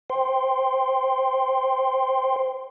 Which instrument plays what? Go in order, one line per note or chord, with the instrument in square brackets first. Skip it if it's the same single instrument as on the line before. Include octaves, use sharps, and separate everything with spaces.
[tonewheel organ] C5 G5 C6